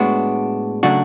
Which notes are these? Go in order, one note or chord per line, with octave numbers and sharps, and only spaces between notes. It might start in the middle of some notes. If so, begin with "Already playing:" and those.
Already playing: A2 G#3 B3 D4 F#4
C#3 F#3 A3 D4 F#4